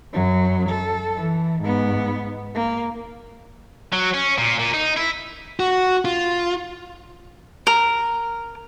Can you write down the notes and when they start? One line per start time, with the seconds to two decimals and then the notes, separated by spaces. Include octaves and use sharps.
0.13 F#2 F#3
0.69 A4
1.16 E3
1.62 G#2 B3
2.55 A#3
3.93 F#3
4.14 C#4
4.38 A#2
4.59 A#2
4.73 D#4
4.97 E4
5.60 F#4
6.05 F4
7.67 A#4